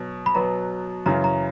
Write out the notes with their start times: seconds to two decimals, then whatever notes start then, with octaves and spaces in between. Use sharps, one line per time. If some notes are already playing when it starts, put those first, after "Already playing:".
Already playing: B2 F#3
0.26 B5
0.34 B2 F#3 B3 A#5
1.06 F#2 C#3 E3 A#5
1.24 A#5